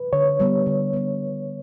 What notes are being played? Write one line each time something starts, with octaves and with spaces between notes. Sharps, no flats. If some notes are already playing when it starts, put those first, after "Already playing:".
Already playing: B4
D3 C#5
G3 B3
D3
G3 B3